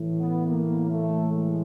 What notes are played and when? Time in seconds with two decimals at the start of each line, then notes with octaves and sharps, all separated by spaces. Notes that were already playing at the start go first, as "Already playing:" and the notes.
Already playing: A2 E3
0.19 B3
0.47 A#3
0.90 A3
1.33 G#3